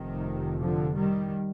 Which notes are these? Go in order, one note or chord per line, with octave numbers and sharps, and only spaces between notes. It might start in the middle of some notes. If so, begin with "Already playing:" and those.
Already playing: F1 F2 C3 D#3
D3 F3
D#3 G3